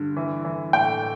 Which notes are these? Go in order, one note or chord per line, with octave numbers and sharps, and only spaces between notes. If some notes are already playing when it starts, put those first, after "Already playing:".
Already playing: G2 D3
E3
E3
A2 G5